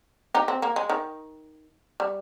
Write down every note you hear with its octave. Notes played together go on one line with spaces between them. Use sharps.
D#4 G4
C4
A#3
G#3
D#3
G3